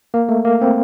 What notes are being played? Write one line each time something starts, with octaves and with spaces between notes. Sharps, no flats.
A#3
A3
A#3
C4